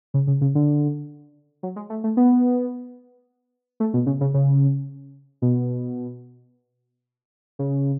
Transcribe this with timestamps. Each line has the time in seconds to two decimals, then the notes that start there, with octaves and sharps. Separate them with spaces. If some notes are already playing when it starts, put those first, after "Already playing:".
0.14 C#3
0.27 C#3
0.41 C#3
0.55 D3
1.63 F#3
1.76 G#3
1.90 A3
2.04 A3
2.17 B3
3.80 A3
3.94 B2
4.06 C#3
4.21 C#3
4.34 C#3
5.42 B2
7.59 C#3